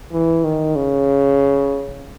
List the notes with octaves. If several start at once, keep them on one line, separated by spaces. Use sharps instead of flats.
E3
D#3
C#3